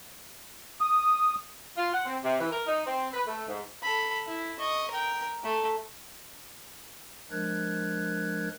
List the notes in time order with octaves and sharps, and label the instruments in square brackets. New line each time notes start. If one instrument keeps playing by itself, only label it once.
[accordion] D#6
[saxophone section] F4
F#5
C4
C3
E3
A#4
D#4
C4
B4
A3
G#2
[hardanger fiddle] A4 B5
E4
D#5 C#6
A#4 G5
A3 A4
[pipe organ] F3 G#3 D4 A#4 F#6 G#6